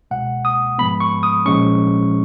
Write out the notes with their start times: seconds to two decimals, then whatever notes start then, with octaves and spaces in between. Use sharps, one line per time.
0.11 C#2 B2 G#3 F#5
0.45 D#6
0.78 G#2 F3 G#3 B3 B5
1.00 C#6
1.23 D#6
1.46 A#1 A#2 F3 G#3 C#4 C#6